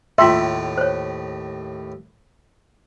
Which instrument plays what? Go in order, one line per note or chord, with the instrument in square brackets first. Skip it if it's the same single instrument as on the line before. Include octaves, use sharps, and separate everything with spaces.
[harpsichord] D#2 A2 [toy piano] F4 G5 C6 [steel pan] E5
[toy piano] C5 C#5